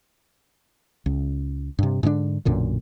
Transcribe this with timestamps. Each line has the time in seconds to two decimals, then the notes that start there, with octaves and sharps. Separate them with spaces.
1.06 C#2
1.79 G2 C3
2.03 G#2 D3 A3 D4
2.45 B1 F#2 A#2 D3